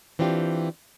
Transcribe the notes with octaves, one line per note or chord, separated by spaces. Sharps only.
E3 C4 D4 F4 G4